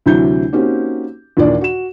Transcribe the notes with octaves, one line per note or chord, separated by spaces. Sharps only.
D2 C3 E3 F#3 E4 G6
A#3 C4 C#4 D#4 F#4 G4
D#2 A#2 E3 D4 D5
F#4 E7